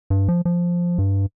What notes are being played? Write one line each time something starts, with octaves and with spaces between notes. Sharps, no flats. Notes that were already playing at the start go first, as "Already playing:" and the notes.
G2
F3
F3
G2